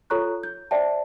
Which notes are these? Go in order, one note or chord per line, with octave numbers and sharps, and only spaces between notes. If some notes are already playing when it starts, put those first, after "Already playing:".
F4 A4 C#5 A#5 C#6 F#6
G6
C5 D5 E5 G5 A5